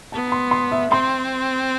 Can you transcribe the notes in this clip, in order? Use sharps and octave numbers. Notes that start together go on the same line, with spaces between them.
B3 A5
C6
C6
E5
C4 C6